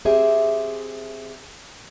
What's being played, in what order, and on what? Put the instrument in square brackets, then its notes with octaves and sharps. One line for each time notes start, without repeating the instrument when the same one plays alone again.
[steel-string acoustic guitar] C4 G4 G#4 E5